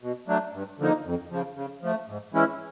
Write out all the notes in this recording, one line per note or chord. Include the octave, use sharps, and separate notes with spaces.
B2
F#3 A3 D4
G2
D3 F3 A#3 D#4
F2
C#3 F3
C#3
F3 A3
G#2
E3 G#3 C#4 E4